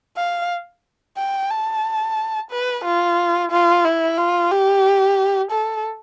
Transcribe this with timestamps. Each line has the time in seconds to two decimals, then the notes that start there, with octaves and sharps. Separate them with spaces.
0.17 F5
1.17 G5
1.51 A5
2.51 B4
2.85 F4
3.51 F4
3.85 E4
4.18 F4
4.51 G4
5.51 A4